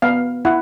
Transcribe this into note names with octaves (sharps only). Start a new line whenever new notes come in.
B3 F5
E4 F#5